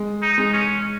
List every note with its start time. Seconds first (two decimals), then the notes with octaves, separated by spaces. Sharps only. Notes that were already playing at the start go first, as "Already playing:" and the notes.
Already playing: G#3
0.22 D#4
0.38 G#3
0.53 C#4